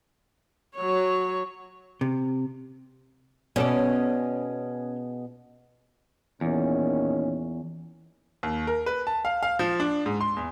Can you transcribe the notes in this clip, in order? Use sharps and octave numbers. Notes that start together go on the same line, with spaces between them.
F#3 C#5
C3
B2 C#4 G#4 A4 D5
E2 A#2 D#3 C#4
D#2
A#4
B4
A5
F5
F5
F3
D4
G#2
C6
E2